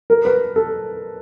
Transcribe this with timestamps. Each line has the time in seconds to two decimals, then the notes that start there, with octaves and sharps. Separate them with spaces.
0.10 A#4
0.25 B4
0.56 A4